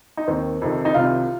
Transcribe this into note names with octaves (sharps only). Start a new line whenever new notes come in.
D#4
D#2 D#3 C4
F2 C3 D#3
D#4
C2 C3 D#3 F4